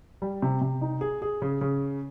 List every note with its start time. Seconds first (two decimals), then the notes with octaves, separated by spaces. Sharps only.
0.22 G3
0.42 C3
0.61 C3
0.81 D#4
1.01 G#4
1.22 G#4
1.42 C#3
1.61 C#3